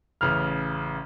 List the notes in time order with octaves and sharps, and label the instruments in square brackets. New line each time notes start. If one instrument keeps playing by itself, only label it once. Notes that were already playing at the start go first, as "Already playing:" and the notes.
[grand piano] A1 C#3 F6